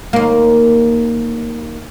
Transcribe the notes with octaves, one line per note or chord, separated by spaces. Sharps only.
D#2 A#3